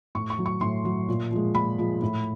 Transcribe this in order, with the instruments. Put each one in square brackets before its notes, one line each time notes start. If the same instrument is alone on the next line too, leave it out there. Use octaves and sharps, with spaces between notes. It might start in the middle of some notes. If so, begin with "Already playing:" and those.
[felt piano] A2 C#6
C#6
F#3
C#6
A2 C6
F#3
A#2
F3 G#3
A#2 B5
F3 G#3
A2